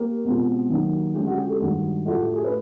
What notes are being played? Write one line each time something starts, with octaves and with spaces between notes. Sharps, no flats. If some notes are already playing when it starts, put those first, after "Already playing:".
Already playing: A#3 G4
B2 G#3 C4 F4
D#3 F#3 A#3 D#4
D3 F3 G#3 C#4 G4
F#4
G4
A4
G2 D#3 G#3 F#4
A2 F3 A3 D4 F4 F#4
G4
G#4
B4